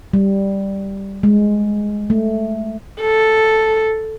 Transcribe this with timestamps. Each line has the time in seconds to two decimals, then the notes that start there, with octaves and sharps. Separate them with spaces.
0.14 G3
1.23 G#3
2.10 A3
3.01 A4